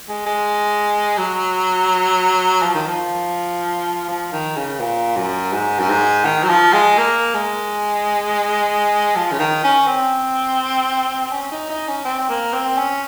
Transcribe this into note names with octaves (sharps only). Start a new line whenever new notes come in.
G#3
G#3
F#3
F3
D#3
F3
F3
D#3
C#3
A#2
F#2
G#2
F#2
G#2
D#3
F#3
F3
G#3
A#3
G#3
F3
C#3
D#3
C#4
C4
C#4
D#4
D#4
C#4
C4
A#3
C4
C#4